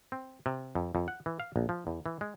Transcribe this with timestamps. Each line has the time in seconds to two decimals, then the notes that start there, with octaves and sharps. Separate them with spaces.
0.12 C4
0.46 C3
0.75 F2
0.95 F2
1.08 F#5
1.26 E3
1.40 F5
1.56 A#1
1.69 F3
1.87 E2
2.06 E3
2.21 G#3